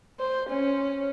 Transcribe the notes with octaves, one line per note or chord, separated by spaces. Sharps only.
C5
C#4